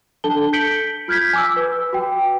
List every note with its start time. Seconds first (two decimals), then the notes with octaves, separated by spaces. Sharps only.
0.24 D4 A4 A5 G7
0.53 G6 B6 C#7 D7 F#7 G7
1.08 F4 F6 G6 G#6 B6
1.33 G#5 D6 E6
1.56 B4
1.93 F#4 G5